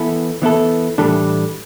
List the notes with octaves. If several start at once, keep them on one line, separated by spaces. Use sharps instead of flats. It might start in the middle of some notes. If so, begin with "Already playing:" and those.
Already playing: E3 B3 E4 A4
E3 B3 E4 A4
A2 E3 G3 D4 A4